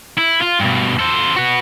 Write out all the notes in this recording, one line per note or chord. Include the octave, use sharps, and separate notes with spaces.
E4
F4
G2 B2
A4 C5
F#4 B4